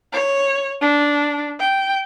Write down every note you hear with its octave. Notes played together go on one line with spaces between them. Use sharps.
C#5
D4
G5